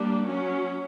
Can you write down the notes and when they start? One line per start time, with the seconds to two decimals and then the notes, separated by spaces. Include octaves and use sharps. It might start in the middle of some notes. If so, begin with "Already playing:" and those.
Already playing: G3 A#3 D4
0.25 F#3 C#4